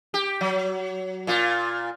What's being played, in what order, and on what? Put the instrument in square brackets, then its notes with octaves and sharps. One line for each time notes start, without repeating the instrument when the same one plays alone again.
[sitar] G4
F#3
A#2 F4